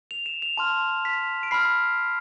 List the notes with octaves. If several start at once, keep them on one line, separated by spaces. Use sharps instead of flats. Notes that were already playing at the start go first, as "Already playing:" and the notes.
F7
E7
F7
A5 C6 F6
B6
D7
B5 F6 C7